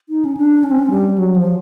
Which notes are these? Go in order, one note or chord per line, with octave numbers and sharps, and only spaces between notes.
D#4
C#4
D4
C#4
C4
C#4
G3
F#3
F3